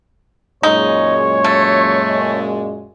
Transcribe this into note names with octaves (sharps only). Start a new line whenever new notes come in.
F#2 A#2 G#3 D#4 C#5
A3